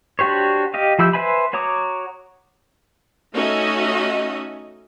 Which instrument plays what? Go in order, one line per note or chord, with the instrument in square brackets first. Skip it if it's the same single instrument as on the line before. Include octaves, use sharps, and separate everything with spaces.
[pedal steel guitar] D4 F#4 G4 C5 C#5
G4 D#5 F5
F3 E4 G4 E6 G6
B4 C5 E5 G#5 B5
F#4 C#5 A#5 D6 D#6
[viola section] A3 C#4 D#4 F#4 D#5 E5